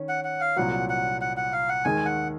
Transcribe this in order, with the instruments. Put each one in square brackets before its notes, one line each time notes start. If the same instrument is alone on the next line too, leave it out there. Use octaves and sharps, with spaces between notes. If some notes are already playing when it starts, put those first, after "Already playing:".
Already playing: [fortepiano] D#3 C#4
[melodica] F#5
F#5
F5
[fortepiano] C2 A#2 F#3 [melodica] F#5
[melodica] F#5
F#5
F#5
F5
F#5
[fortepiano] D#2 D#3 G#3 [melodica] G#5
[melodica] F#5